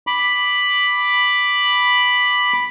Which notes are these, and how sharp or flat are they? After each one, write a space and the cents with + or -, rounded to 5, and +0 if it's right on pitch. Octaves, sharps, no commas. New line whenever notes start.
B5 +0 D6 +0